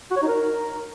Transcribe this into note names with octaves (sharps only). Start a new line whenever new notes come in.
F#4
C#5
D#4
A#4